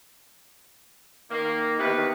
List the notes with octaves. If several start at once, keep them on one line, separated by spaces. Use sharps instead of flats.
D#3 A#3
C3 D#3 E3 B3 B4